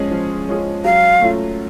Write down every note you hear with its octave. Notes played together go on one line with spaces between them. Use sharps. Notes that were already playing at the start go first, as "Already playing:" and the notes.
Already playing: F3 G#3 C#4 F4 G#4
F3
G#3 C#4 F4 G#4
F#3 F5
A3 C#4 F4